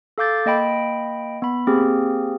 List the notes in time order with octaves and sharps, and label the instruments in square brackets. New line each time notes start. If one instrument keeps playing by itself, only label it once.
[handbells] A4 F5 D6 G6 A6
A#3 D#5 G5 B5 D7
B3 B5
A#3 C4 G4 G#4